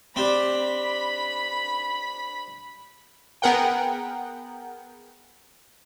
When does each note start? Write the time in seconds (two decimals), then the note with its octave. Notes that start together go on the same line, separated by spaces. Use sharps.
0.16 C4 D4 G4 B5
3.42 B3 G#4 A#4 F#5 G5